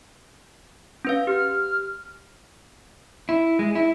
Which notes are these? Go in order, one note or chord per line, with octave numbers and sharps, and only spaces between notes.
C#4 B4 F5
G4 F6
E4
G#3
E4